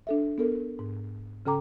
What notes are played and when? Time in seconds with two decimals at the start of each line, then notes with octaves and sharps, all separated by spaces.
0.07 D4 A4 E5
0.38 B3 A4 A#4
0.79 G#2
1.46 C#3 C#4 A4 G5 A#5 D6